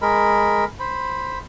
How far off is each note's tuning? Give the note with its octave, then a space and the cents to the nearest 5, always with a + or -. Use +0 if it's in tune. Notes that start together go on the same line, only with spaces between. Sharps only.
G#3 +0 A#4 +0 B5 +0
C5 +0 B5 +0